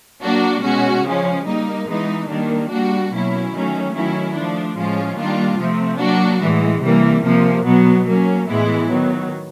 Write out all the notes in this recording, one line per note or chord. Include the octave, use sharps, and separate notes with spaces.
F#3 A#3 D4 F#4
B2 G#3 C#4 F#4
C#3 F3 G#3 C#4
G3 A#3 D#4
E3 G#3 B3 D#4
D#3 G3 A#3 D4
G3 A#3 D4 F#4
B2 F#3 A#3 C#4 E4
D#3 F#3 A3 C#4
D#3 F#3 A3 C#4 E4
F3 A3 D4
A2 F3 G#3 C#4 F4
D#3 G3 A#3 D4 F4
C3 F3 A3 C4
F#3 A#3 D4 F#4
A2 E3 G#3
C3 E3 G3 A#3
C3 F3 A#3
B2 F#3 B3
F#3 A#3 C#4
A2 E3 G#3 B3 E4
D#3 F#3 B3